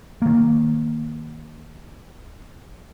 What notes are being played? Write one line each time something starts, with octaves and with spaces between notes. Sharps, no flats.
D#3 A#3